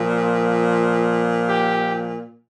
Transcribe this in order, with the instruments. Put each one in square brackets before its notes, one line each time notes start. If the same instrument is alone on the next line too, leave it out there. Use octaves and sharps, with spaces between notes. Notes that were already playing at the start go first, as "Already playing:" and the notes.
Already playing: [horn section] A#2 F3
G4